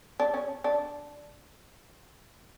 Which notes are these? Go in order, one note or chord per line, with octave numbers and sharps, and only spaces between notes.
D4
C#4
D4